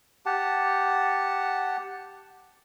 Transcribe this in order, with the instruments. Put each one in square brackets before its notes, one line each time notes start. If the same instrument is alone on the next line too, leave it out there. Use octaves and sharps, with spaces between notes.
[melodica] G4 F#5 A5